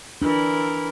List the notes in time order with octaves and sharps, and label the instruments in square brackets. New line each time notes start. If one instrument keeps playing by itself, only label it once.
[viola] E3 A#4 [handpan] D4